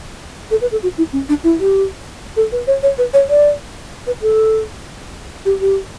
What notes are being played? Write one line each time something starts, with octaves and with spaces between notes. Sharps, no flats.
A4
B4
A4
F#4
E4
C#4
D4
E4
G4
A4
B4
C#5
C#5
B4
C#5
D5
B4
A4
G4
G4